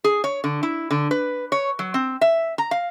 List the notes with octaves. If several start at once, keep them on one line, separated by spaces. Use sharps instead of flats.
G#4
C#5
D3
E4
D3
B4
C#5
F#3
C4
E5
A#5
F5